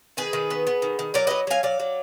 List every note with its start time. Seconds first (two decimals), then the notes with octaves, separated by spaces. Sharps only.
0.17 D#3 G#4 B4
0.33 D#3
0.50 B3
0.67 B3
0.82 D#3
0.99 D#3
1.14 F#3 A#4 D5
1.27 F#3 B4 D#5
1.47 F#3 F5 G#5
1.63 F#3 D5 F5
1.80 F#3